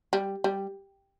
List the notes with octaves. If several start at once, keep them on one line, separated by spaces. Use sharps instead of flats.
G3
G3